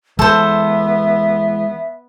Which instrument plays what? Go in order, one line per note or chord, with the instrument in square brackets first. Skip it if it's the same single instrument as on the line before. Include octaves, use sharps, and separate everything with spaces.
[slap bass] E3 G#3 [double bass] B3 [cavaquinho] A4 C5 [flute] E5